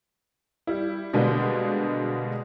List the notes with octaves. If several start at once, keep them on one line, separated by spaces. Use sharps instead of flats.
G3 E4
B2 D3 G3 G#3 A#3